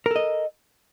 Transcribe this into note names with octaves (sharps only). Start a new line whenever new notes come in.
A4 A#4 D#5